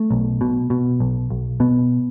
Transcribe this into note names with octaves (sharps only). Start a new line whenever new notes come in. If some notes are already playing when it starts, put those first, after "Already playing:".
Already playing: A3
B1
B2
B2
B1
B1
B2 B3